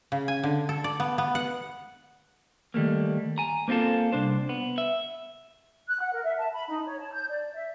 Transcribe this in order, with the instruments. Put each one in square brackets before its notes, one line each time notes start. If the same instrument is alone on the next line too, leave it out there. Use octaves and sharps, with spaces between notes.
[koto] C#3
G#5
D3
A4
D5
B3
B3
F#5
[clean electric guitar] D#3 G3 A3 A#3
G#5 A#5
A#3 C4 D#4 F4 A4
C2 D4 C5
B3
E5
[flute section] F#6
F#5
A#4
E5
A5
B5
D#4
C#5
A5
G6
D5
E5